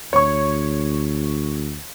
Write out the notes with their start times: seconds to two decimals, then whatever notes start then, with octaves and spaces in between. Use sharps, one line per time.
0.13 D2 C#5 C#6